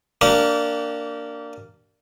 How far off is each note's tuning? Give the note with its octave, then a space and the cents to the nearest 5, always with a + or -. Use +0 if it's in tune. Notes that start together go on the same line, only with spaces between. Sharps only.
A#3 -15 D4 +0 G4 -35